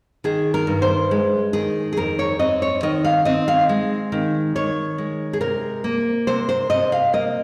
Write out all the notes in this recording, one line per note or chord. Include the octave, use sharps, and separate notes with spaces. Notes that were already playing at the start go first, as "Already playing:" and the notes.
D#3 G#4
A#4
G2
C5
G#3
D#3 G#4
G#4
F2 A#4
C#5
C4 D#5
C#5
D#3 D#5
F5
C4 D#5
F5
G#3
D#3
D#3 C#5
G#3
G#4
C3 A#4
A#3
C3 C5
C5
C3 D#5
F5
A#3 D#5